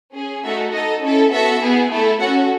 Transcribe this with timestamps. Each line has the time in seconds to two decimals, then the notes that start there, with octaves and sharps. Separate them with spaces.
0.14 C#4 G#4
0.44 A3 D#4 F#4 A4 E5
0.73 D#4 A4 D#5
1.03 C#4 E4 A4
1.31 B3 F#4 A4 E5
1.61 B3 E4 G#4
1.90 A3 E4 A4
2.20 C#4 F#4 A4 F#5